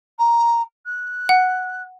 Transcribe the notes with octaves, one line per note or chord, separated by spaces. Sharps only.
A#5
F#6
F#5